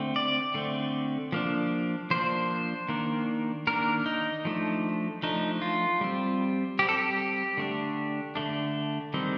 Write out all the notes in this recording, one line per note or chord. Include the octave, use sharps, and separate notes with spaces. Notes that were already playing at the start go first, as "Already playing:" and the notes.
Already playing: D3 A3 C4
D5
D3 A3 C4
F3 A#3 D4
F3 A#3 D4 C5
D#3 A#3 D4
D#3 A#3 D4 A#4
D#4
F3 A3 D4
F3 A3 D4 D#4
F4
G3 C4
G3 C4 G4
A4
G4
D3 A3 D4
D3 A3 D4
D#3 G3 C4